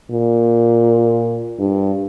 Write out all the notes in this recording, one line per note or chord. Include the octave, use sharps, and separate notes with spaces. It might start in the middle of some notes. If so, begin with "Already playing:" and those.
A#2
G2